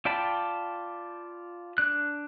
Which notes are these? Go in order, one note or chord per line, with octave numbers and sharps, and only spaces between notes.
F4 D5 G5 A5 B5
D4 F#6